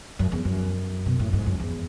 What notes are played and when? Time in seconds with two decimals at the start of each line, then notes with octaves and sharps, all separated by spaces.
0.19 F#2
0.32 E2
0.45 F#2
1.06 B2
1.19 A2
1.33 G#2
1.46 F#2
1.60 E2